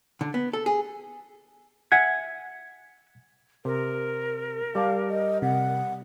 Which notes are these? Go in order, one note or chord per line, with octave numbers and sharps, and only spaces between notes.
D3
B3
A4
G#4
E5 F#5 G#5 G#6
C3 A#4
G3 D5 F5 A5
D#5
C3 F#5